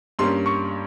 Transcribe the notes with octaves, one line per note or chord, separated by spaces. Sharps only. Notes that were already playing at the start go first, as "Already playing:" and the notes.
G2 G3 A#3 C#4 C6
C#6